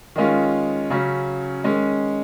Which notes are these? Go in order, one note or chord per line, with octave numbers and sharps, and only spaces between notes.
D#3 G#3 C#4 F4
C#3 F#3 C#4
D#3 G#3 C#4